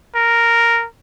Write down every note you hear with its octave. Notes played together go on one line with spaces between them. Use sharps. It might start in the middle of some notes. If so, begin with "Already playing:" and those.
A#4